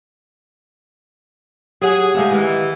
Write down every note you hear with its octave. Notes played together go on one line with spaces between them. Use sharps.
F#3 G4 G#4 F#5
C3 G#3 F5 A5
D#3 E3